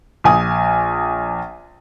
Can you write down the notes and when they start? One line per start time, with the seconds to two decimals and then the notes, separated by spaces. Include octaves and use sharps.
0.24 A#1 G#5 D#6